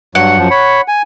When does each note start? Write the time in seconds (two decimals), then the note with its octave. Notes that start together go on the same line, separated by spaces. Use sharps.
0.15 G2 F#3 F#5
0.38 F#2 F3
0.51 C#5 B5
0.88 G#5